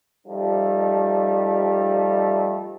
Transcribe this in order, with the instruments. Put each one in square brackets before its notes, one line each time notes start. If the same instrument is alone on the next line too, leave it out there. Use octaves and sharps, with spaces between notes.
[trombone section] F3 G3 A3 D#4